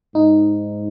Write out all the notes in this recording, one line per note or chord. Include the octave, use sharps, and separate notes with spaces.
G#2 D#4